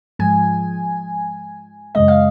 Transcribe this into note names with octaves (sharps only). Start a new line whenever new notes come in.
G#2 F3 G#3 G#5
F#2 C#3 G#3 D#5
F5